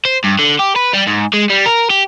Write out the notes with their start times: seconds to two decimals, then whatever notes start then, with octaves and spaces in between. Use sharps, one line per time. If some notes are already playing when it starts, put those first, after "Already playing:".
0.05 C5
0.24 G2
0.39 D3
0.59 G4
0.76 B4
0.93 G3
1.07 G#2
1.33 G#3
1.50 G3
1.66 A#4
1.90 G4